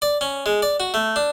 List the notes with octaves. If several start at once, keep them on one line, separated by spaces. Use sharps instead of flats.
D5
C#4
G#3
D5
F#4
A3
D4